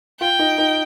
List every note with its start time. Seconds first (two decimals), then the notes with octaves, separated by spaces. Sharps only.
0.20 F4 G5
0.39 D#4
0.58 D#4